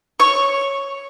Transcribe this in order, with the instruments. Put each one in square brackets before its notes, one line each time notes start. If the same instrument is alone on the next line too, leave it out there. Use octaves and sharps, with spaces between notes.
[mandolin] C#5 C#6